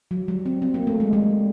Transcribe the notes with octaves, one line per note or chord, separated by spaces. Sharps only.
F#3
G3
C4
C4
A#3
A3
G#3
G3